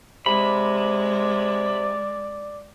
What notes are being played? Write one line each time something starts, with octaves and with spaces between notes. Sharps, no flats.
C3 G#3 D5 B5